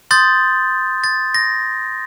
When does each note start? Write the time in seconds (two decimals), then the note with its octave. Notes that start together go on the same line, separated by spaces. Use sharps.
0.11 C6 D#6 G6 A6
1.04 A6
1.34 A#6